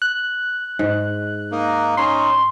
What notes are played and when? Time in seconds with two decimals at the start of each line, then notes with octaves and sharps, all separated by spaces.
0.02 F#6
0.79 G#2
1.52 A#3 D#4
1.97 C#4 D#4 C6